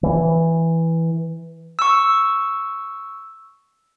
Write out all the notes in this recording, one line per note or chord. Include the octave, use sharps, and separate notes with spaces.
E3
C#6 E6